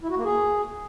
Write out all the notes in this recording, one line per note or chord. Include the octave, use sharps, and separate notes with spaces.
E4
F#4
A#3
G#4